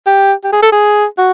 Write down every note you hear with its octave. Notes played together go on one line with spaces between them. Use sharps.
G4
G4
G#4
A4
G#4
F#4